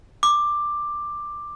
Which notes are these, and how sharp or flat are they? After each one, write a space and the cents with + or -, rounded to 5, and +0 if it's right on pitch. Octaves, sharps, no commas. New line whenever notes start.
D6 +10